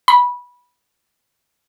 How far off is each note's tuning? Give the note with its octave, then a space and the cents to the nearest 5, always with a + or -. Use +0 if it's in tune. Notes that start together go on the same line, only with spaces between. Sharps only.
B5 -15